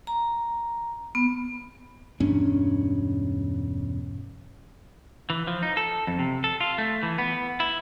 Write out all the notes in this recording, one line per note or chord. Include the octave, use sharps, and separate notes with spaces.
A#5
B3
E1 G2 C#4 D4
E3
F3
D#4
A4
F2
C3
A4
F4
A3
E3
B3
E4